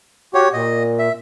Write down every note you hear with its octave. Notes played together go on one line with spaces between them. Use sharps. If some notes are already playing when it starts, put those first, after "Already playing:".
F#4 G4 C#5
A#2 D#5
E5